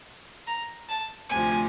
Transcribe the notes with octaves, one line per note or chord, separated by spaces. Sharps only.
A#5
A5
D2 C3 F3 G#5